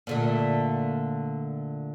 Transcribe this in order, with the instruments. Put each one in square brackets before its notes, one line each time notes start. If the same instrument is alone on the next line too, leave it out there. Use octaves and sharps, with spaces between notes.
[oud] A#2 D3 A3